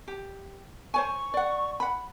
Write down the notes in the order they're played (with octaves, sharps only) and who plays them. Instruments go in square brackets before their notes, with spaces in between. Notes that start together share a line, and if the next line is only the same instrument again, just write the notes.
[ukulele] G4
[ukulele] C5 C#5 G#5 [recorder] C#6
[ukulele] D5 F#5
F#5 B5